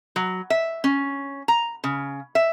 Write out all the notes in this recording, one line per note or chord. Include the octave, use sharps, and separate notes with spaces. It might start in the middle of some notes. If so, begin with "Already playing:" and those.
F#3
E5
C#4
A#5
C#3
E5